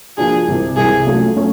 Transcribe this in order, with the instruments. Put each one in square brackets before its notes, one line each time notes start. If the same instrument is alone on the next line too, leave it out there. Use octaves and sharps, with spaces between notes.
[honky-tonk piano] F3 A#3 D4 F#4 [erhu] G#4
[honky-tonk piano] C2 C3 E3
[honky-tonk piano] C2 C3 E3 [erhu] G#4
[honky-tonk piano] F#3 A3 C#4 F4 A4
F#3 A3 C#4